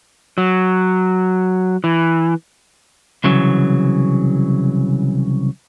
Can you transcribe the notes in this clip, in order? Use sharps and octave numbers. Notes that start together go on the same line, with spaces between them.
F#3
E3
C2 C#3 E3 F#3